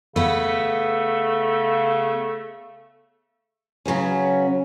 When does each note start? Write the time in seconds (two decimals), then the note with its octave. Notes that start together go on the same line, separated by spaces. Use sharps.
0.16 C#3 A3 B3 B4
3.86 C#3 F#3 B3 C#4